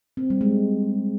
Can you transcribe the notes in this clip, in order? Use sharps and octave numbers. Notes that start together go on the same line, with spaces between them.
C4
G3
G#3